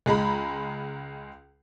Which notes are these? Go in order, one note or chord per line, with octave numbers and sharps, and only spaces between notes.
C#2 G#3 A#5 B5